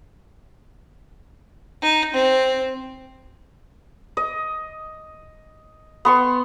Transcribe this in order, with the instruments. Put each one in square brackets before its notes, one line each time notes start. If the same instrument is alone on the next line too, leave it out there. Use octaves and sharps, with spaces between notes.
[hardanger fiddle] D#4
C4
[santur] D#5
B3 C6 C#6